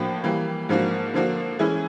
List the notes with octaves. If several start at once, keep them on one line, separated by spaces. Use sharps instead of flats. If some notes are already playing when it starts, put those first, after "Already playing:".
Already playing: A2 F3 A#3 D4 F#4
E3 G3 A#3
G#2 F3 A#3 D4 F#4
D3 F3 A#3 D4 F#4
E3 G#3 C#4 E4 G#4